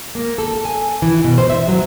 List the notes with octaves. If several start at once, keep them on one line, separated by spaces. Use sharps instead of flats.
A#3
A4
G#5
E3
B2
C5
E5
F#3